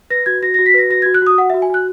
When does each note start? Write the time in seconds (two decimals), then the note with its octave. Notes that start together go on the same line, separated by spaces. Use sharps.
0.10 B4 A#6
0.26 F#4 G#6
0.42 F#4 A#6
0.54 A#6
0.59 F#4
0.66 B6
0.74 B4 A#6
0.90 F#4 A#6
1.02 G#6
1.06 F#4
1.14 F#6
1.22 F#4 D#6
1.38 F#4 F#5
1.50 E5
1.54 F#4
1.62 G#5
1.70 F#4 F#6